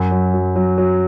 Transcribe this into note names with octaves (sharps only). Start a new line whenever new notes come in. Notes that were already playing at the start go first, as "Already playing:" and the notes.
Already playing: F#2
F#3
F#3
F#3
F#3